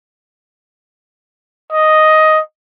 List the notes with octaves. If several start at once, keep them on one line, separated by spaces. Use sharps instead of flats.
D#5